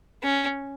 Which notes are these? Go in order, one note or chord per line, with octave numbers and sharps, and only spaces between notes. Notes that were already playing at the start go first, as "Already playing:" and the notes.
C#4